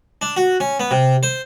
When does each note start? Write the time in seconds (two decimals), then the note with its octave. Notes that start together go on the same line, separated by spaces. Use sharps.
0.22 D4
0.36 F#4
0.60 C#4
0.80 B3
0.91 C3
1.23 C5